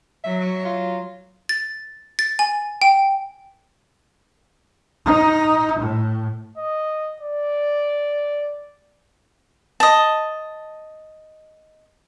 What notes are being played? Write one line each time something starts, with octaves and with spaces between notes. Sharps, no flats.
F#3 E5
F4
A6
A6
G#5
G5
D#4
A2
D#5
D5
D#5 A5